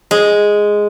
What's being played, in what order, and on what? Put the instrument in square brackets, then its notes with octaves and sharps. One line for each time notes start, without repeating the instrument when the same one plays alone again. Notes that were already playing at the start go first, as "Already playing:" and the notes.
[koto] G#3